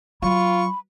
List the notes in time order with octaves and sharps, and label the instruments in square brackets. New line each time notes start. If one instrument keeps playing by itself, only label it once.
[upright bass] F#3 [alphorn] F4 [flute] B5 [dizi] C#6